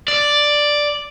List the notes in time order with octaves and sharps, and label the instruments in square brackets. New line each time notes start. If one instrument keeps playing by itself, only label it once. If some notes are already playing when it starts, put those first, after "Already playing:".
[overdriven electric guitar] D5